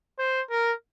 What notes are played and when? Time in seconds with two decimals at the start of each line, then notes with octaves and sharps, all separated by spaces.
0.19 C5
0.50 A#4